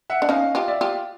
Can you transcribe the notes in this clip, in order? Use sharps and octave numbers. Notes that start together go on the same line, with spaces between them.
E5 F#5
D4
C#4 D#4 D#5 F5
F4 G4
D5 E5
F4 G4